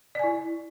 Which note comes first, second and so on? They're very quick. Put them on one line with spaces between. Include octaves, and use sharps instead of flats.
D5 G#5 E4